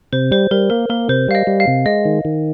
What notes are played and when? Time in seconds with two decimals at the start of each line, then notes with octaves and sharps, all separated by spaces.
0.12 C3 C5
0.31 G3 C5
0.51 G3 A#4
0.70 A#3 A#4
0.90 A#3 A#4
1.09 C3 C5
1.28 G3 F5
1.35 D#5
1.47 G3
1.60 F5
1.67 C3
1.86 G#3 D#5
2.05 D#3
2.25 D#3